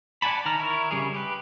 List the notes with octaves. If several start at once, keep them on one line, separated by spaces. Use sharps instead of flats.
D5 F#5 G#5 A5 B5
D#3 A#5 F6
E4 A#4 C#5
C#3 G3 G#4
G4 B4